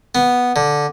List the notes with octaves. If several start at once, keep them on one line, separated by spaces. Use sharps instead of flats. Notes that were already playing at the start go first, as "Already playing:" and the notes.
B3
D3